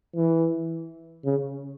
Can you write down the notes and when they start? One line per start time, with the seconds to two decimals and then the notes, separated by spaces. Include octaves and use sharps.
0.16 E3
1.25 C#3